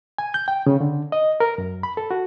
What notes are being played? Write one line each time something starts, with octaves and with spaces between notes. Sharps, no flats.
G#5
G6
G5
C#3
D3
D#5
A#4
F#2
B5
A4
F#4